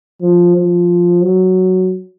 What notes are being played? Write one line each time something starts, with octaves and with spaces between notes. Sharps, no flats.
F3
F3
F#3